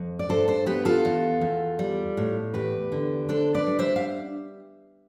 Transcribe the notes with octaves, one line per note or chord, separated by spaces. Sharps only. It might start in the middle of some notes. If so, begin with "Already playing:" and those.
Already playing: F2
D5
G2 A4 C5
A4 C5
B3 G4 B4
F4 A4
E2
E2
G3
A2
E2 G4 B4
D3
D4 A4 C5
B4 D5
G3
C5 E5
F5